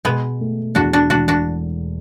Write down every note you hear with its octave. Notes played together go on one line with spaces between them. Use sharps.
B2 G#3 B3
A3
E2 D4 F#4
D4 F#4
E1 D4 F#4
D4 F#4